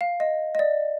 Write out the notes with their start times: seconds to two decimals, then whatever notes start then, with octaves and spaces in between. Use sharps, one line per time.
0.01 F5
0.20 D#5
0.55 D#5
0.59 D5